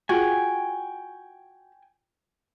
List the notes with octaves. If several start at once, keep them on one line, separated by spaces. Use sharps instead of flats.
F4 F#4 G#4 G5 G#5